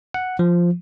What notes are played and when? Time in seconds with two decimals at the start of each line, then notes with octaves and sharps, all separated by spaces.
0.14 F#5
0.39 F3